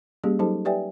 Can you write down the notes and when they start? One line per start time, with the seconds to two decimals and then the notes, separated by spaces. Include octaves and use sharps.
0.24 G3 A#3 C#4 G4 G#4
0.39 F#3 D#4 G4 A4 C5 A5
0.65 G4 B4 D5 E5 G5 G#5